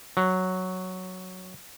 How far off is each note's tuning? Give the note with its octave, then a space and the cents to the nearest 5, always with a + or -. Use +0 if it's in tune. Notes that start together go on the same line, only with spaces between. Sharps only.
F#3 +0